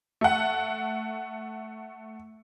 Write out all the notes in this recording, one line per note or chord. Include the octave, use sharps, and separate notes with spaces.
A3 F#5